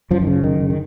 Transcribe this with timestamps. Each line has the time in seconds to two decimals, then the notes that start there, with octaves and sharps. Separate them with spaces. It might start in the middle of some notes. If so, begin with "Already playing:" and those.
0.11 F#2 F3
0.22 D#3
0.27 C#3
0.33 F3
0.44 F#2 D#3
0.60 C#3
0.70 D#3